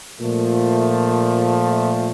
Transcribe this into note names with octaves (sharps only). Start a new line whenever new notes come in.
A#2 F3 A3